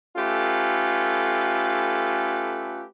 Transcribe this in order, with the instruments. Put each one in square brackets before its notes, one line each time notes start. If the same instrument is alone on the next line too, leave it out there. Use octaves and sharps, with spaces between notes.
[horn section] A3 C#4 F4 G4 A4 B4